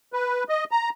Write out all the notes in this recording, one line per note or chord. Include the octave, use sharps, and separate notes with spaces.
B4
D#5
A#5